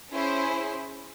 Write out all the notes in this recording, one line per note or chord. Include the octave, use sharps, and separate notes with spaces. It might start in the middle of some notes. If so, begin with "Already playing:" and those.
C#4 E4 G#4 C5